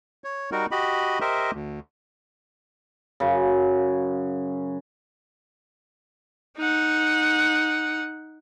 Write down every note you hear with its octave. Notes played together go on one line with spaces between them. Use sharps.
C#5
G3 D#4 F#4 A#4
F#4 G4 D#5 B5
G4 A#4 C5 D#5 E5
D2
F#2 C#3
D#4 F#5